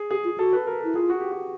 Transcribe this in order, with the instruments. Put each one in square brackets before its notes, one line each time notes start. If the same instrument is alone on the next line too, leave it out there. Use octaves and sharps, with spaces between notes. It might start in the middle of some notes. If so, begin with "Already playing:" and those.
Already playing: [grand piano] G#4
[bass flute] G4 [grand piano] G#4
[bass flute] F4
[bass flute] F#4 [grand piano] A4
[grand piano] B4
A#4
[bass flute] E4 [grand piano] A4
[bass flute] F4 [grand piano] G#4
[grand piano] F#4
G4
F#4